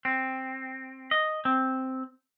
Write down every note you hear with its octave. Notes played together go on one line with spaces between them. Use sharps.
C4
D#5
C4